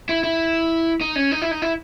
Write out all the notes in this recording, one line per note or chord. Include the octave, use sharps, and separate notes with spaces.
E4
E4
D#4
C#4
D#4
E4
D#4
E4